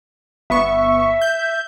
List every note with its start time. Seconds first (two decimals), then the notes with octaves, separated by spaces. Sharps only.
0.50 G1 B3 E5 C#6
1.21 G6